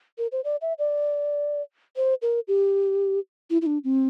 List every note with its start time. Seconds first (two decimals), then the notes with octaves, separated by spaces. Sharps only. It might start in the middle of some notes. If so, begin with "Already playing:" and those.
0.18 A#4
0.32 C5
0.44 D5
0.61 E5
0.79 D5
1.97 C5
2.22 A#4
2.48 G4
3.50 E4
3.62 E4
3.66 D4
3.84 C4